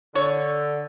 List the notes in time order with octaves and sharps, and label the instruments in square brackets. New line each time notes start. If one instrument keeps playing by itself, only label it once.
[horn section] D3 [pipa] C#5